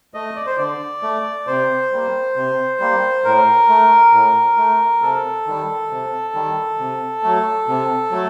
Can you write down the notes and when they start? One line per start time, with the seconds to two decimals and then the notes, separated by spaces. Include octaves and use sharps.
0.14 A3 D#5
0.36 D5
0.46 C5
0.58 D3 D5
1.03 A3
1.47 C3 C5
1.92 G3 A#3
2.36 C3
2.80 G3 A#3
3.24 A2 A#4
3.69 A3
4.13 A2
4.57 A3
5.02 C3 A4
5.47 D#3 G3
5.90 C3
6.34 D#3 G3
6.79 C3
7.23 F#3 A3
7.68 C3
8.11 F#3 A3